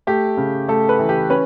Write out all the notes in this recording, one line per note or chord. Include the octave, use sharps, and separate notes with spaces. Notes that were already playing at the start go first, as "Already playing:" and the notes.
A3 G4
C#3
A3 A4
B4
E3
G4
C#4 B4